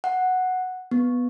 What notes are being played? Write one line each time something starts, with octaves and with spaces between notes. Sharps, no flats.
F#5
B3